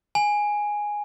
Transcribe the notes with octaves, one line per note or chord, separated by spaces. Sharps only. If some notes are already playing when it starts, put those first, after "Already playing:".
G#5